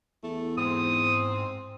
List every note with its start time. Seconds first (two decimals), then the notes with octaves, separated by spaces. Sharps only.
0.23 E2 A3
0.58 G#2 C4 D#6